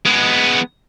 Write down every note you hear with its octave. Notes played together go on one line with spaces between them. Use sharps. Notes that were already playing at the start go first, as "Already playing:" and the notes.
G#3 B3